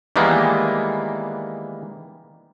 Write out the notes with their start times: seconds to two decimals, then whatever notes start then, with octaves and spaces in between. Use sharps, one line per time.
0.16 D#3 E3 G3 G#3 A#3 B3